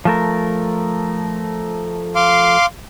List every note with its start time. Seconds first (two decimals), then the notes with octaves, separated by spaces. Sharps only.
0.05 F3 A3 A#4
2.15 F5 C6 D6